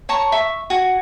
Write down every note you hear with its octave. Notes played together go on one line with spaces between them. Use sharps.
C#5 A5 A#5 C#6
E5 C#6
F#4 G#5